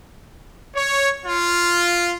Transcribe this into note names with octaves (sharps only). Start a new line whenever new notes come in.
C#5
F4